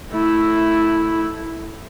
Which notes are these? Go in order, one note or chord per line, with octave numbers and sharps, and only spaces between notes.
A3 E4